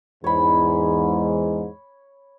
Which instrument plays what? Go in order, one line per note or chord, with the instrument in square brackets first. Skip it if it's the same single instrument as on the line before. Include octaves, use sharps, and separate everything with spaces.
[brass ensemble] E2 G#2 [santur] C#5 B5